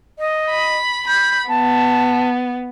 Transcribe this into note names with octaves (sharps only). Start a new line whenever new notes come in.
D#5
B5
B5 G6
B3 A5